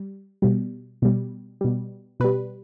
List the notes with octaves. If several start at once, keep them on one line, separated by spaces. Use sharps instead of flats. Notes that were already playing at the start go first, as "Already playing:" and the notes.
Already playing: G3
B2 G3
B2 G3
B2 G3
B2 G3 B4